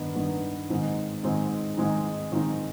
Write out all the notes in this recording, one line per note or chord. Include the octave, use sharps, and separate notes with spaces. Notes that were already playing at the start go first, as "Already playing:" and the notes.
Already playing: G2 D#3 B3 D#4
G2 D#3 B3 D#4
G#2 D#3 G#3 C4 D#4
G#2 D#3 G#3 C4 D#4
G#2 D#3 G#3 C4 D#4
G#2 D#3 G#3 C4 D#4